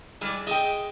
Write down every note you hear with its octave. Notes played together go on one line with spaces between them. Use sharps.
G3 G#3 E4 D5
G#3 D#5 E5 G5